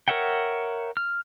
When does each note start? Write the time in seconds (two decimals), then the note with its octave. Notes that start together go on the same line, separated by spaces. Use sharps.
0.08 A#4 C#5 E5 F#5 G5
0.97 F6